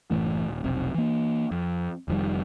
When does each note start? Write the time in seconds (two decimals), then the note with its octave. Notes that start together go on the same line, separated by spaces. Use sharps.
0.11 F#1 A2 E3 A3
0.48 D#1
0.64 F1 B1 C3
0.94 E3 A#3
1.51 F2
2.08 F1 F2 D#3 G3